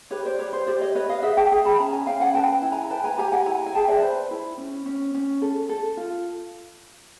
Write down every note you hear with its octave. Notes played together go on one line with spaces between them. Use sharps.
G4 B4 C#5
C5 D5
G4 B4 C#5
C5
G4 C5 D5
C#5 D#5
B4 C#5 D#5
D#5 F5
G#4 E5 F#5
G5 A5
G#4
A5 B5
C#4 G#5 A#5
G#5 A#5
C#4 F5 G5
F#5 G#5
B4 G5 A5
E4
G#5 A#5
B4 G5 A5
G#5 A#5
G4 G#5 A#5
F#5 G#5
E4 G#5 A#5
G#5
G#4 G5 A5
D5 E5
B4 C5
E4
C#4
C#4
C#4
A4
A4
F4